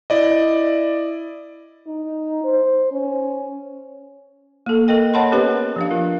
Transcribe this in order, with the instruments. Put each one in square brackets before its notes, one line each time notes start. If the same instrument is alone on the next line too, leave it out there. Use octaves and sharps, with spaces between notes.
[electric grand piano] E4 D5 D#5
[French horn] D#4
C5
C#4
[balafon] A#3 A4
A4 A#4 D#5 G5
C#5 D#5 F#5 A5 B5 C6
B3 C#4 G4 A#4 B4 C#5
F3 D4 F5
F4 A#4